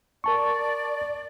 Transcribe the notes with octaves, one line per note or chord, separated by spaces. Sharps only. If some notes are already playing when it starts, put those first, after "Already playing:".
A#4 D5 A5 C#6